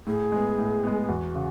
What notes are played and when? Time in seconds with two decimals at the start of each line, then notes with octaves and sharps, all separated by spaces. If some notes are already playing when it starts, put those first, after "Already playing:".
0.07 A2 G#4
0.32 G#3 B3
0.58 A2
0.83 G#3 B3
1.01 G#4
1.09 E2 F#4
1.35 C#3